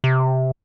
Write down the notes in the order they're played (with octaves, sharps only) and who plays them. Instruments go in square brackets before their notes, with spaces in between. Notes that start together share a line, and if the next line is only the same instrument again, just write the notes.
[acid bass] C3